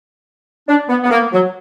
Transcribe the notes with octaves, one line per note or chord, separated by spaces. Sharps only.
D4
B3
B3
A#3
F#3